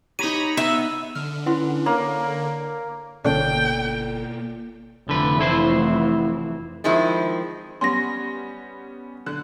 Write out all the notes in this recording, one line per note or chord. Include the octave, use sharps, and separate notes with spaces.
D#4 G4 C#5 A#5 B5 D#7
B3 E5
D3 F6
C#4 E4 B4 F#5 C6
A#3 C#5 B5
G1 B2 D3 A#3 C#4 D4 A4 G5
F1 D3 E3 B4
A3 E4 C5
D#3 F3 G#3 C4 E4
G3 B3 C#4 C6 A#6
D3 F#6